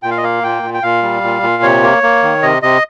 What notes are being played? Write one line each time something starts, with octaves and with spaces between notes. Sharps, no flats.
A#2 G5
F5
D#5
A#3 F5
A#2 G5
A#2
G5
A#2 F5
G3
A#2
A#2
C3 C#5
A#3
A#3
D#3
C3 D#5
C3 D#5